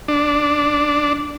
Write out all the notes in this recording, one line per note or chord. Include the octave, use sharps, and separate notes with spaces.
D4